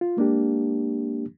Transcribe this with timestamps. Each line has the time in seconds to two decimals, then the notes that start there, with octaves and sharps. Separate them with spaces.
0.01 F4
0.17 G#3 A#3 D4 G4